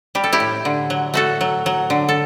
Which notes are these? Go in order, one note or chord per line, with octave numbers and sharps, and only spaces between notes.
G3 G4
A4
E4 G4
A2
D3
F#3
A3 F#4 A4
F#3
F#3
D3
A4